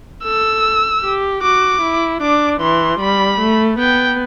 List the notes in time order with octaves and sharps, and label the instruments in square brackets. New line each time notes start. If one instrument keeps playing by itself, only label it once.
[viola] A4 [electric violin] E6
[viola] G4
[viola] F#4 [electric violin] D6
[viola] E4
[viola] D4 [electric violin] D6
[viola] E3 [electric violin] C6
[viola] G3 [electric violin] B5
[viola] A3
[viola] B3 [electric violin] G5